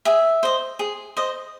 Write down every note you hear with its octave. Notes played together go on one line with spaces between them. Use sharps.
G#4 E5
C5 D#5
G#4
C5 D#5